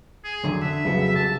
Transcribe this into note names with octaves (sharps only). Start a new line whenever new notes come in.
G#4
F2 D3 F#3
D3 E5
B1 F2 C#3 F#3 B3
C2 A5